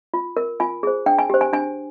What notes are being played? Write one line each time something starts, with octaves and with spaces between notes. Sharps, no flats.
F4
A#4
F4 G#5
G#4 C5
D4 G5
G#5
G4 C5
G#5
D4 G#5